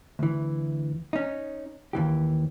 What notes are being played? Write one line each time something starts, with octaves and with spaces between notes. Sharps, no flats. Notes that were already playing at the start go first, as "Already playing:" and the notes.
D2 E3
C#4 D#4
D#2 E3 G4